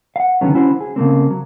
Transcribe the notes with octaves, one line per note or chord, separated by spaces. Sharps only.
F5 F#5
C#2 D3 D#3 F#3 B3 C#4
C#4 E4 F#4 C5
G#4
C#3 A3 A#3 C4
F#3